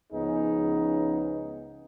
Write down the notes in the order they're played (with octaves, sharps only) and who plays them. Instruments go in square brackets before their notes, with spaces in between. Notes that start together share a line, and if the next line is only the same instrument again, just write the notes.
[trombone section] C#2 F3 B3 C#4 D#4 G#4